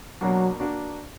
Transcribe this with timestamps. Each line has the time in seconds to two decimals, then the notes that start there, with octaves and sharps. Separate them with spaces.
0.21 B2 F#3 A#3 D4 F#4
0.60 A#3 D4 F#4